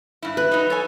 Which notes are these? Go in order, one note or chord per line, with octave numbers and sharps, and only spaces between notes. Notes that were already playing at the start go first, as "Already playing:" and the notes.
G2 E4
B4
F#3 D#4
A4 C#5 G#5